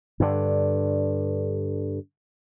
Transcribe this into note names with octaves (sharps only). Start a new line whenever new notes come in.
G2 D3